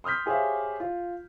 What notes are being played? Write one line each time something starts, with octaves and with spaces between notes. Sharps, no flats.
C6 D#6 F6 G6 B6
G4 G#4 C5 C#5 E5 F5
F4